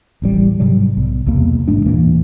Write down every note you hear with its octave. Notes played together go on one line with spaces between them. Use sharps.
D#1 A1 G3
G#2 C3 F#3 G3
B1
B1 E2 C3 A#3
A1 G#2 G#3 D4
D#2 A#2 E3 A#3